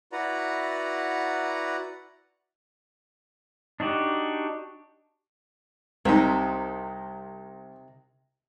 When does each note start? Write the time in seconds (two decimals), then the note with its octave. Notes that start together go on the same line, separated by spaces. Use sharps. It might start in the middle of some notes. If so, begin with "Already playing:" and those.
0.12 E4 F#4 B4 D5 F#5 A#5
3.80 D4 D#4 F#4 G4
6.05 C2 C3 D#4